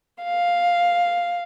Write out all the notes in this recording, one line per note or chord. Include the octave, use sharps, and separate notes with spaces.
F5